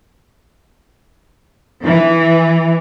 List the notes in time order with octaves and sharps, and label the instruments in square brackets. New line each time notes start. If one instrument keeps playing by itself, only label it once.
[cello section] E3